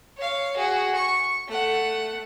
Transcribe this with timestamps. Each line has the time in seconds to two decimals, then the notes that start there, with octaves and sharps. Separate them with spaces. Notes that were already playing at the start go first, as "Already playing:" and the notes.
0.17 C#5 F5
0.57 F#4 G#4
0.96 C#6
1.47 A3 F#5